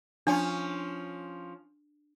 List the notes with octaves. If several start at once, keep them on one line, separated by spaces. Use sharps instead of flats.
F3 C#4 D4